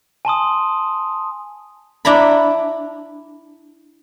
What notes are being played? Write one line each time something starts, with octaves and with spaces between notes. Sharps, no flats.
G#5 A5 C6 D#6
D4 E4 A#5 B5